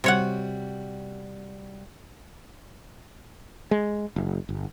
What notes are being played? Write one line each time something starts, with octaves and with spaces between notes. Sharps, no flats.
C3 G3 F#4 C#5 F#5
G#3
F#1
G1